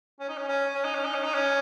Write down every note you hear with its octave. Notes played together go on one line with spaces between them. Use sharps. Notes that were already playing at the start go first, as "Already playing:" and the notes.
C#4
D#4
C#4
C#4
C#4
D#4
C#4
D#4
C#4
D#4
C#4